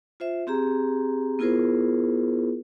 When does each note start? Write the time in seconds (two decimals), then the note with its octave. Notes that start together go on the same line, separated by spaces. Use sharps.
0.20 F4 C5 E5
0.47 C4 G4 G#4 A#5
1.39 B3 E4 F4 G#4 A#4 C5